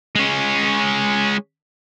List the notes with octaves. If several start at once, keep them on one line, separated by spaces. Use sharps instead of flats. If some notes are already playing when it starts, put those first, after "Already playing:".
G#3 C#4